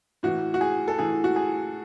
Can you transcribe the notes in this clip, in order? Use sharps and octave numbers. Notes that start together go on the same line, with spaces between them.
A2 E3 F#4
F#4
G#4
A4
A2 E3 G#4
F#4
G#4